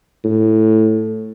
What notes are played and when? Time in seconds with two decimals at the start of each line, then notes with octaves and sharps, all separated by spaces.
0.24 A2